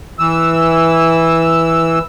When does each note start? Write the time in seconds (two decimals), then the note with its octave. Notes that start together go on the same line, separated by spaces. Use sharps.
0.19 E3 E6